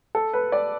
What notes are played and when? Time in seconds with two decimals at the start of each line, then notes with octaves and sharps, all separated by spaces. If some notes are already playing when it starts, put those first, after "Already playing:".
0.15 A4
0.33 B4
0.52 D5